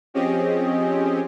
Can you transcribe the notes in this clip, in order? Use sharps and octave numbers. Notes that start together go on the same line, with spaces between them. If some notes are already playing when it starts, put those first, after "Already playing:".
F3 C4 C#4 G4 G#4 D#5